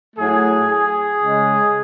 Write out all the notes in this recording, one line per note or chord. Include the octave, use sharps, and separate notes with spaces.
A2 F#3 A3 G#4
G#4
C#3 G#3